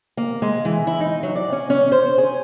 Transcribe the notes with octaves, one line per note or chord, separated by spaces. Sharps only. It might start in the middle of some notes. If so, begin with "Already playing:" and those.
A#3
G#3
E3
E4
D#4
F#3
D5
C#4
C#4
C5
G#4